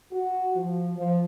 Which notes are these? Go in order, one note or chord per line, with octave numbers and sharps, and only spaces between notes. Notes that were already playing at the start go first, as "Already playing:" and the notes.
F#4
F3
F3